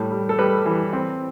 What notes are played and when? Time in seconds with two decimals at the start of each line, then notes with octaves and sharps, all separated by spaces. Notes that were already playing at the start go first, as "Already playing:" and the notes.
Already playing: A2 G3
0.11 G3
0.29 A4
0.39 G3 B4
0.66 E3
0.93 C4